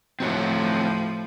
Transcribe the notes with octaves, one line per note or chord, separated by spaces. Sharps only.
A2 F3 C4 F#4 C#5